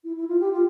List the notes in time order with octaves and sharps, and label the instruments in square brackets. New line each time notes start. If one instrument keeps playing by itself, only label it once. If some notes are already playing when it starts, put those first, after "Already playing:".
[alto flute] E4
E4
F4
G4
F4